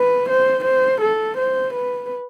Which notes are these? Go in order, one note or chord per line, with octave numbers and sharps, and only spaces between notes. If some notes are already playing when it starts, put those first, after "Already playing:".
Already playing: B4
C5
C5
A4
C5
B4